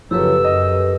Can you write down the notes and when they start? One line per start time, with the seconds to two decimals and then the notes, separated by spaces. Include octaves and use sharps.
0.11 F#1 C#3 F3 F#3 G4 A4 B4 E6
0.44 F#2 D#5